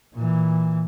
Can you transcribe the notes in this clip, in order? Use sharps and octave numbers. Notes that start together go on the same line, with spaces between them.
A#2 E3